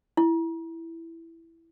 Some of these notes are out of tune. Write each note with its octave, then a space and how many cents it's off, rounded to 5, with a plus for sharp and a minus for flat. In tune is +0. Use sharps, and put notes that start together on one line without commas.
E4 +5